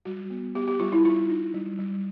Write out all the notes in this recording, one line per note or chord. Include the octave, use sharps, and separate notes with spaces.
G3 F#4
B3
B3 G4
G4
G3 F4
E4
D#4 F4
D#4
G3
G3